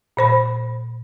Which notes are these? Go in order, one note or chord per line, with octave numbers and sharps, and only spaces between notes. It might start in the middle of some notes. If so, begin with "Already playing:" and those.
A#2 C5 B5